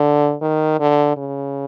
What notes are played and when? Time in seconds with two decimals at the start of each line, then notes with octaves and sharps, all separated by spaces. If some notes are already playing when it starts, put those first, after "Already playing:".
Already playing: D3
0.42 D#3
0.80 D3
1.17 C#3